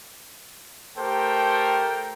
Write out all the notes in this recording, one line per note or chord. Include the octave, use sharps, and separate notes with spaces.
A3 G4 A4 A#4 C5 G5